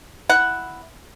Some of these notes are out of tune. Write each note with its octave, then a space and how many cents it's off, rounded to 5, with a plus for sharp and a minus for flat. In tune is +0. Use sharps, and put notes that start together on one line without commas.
E4 +0 F#5 +0